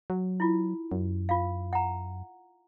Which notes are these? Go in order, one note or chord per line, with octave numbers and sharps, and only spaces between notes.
F#3
E4 F4
F#2
F4 F5
F#5 A#5